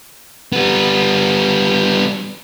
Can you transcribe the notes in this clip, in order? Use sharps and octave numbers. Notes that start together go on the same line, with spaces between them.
G3 B3